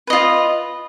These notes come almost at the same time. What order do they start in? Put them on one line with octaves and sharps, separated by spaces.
B4 D#5 F4